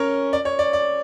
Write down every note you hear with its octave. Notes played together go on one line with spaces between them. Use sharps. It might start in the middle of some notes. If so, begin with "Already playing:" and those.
Already playing: C#4 A#4 C#5
D5
C#5
D5
D5